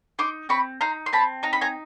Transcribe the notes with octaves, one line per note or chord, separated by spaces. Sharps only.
D#4 C6 D6
C4 B5 C#6
D#4 A#5 C6
C6
C4 A5 B5
D#4 A#5
B5
G#5 A#5